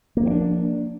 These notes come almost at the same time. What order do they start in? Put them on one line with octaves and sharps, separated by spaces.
A#3 F3 C4 D4